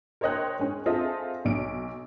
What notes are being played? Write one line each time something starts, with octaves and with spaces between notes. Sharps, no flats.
A#4 C5 C#5 D#5 G5 F#6
G#3 C#4
C4 F4 G#4 A4 D#5 E5
B1 D7